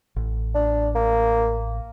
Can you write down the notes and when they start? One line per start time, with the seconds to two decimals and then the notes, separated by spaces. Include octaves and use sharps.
0.16 A1
0.55 D4
0.95 A#3